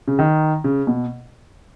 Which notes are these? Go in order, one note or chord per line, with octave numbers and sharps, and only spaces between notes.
C#3
D#3
C#3
B2